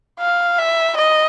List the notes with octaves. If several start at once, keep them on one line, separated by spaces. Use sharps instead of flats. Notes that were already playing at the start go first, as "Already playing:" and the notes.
F5
E5
D#5